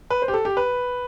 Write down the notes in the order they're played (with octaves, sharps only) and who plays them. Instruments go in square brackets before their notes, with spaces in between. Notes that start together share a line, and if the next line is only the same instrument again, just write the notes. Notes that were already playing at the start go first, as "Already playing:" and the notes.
[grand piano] B4
C5
G4
A4
G4
B4